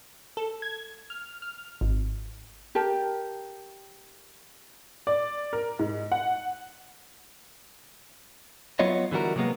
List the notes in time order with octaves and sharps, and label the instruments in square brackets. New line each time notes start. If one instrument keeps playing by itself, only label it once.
[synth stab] A4
G#6
F6
F6
G#1
[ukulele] G4 A#4 G5 A5
[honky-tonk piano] D5
A#4
G#2
F#5
[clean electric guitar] F#3 B3 F4 C#5 D#5
D3 E3 G3 F#4 A#4
C3 F#3 G#3 A#3 B3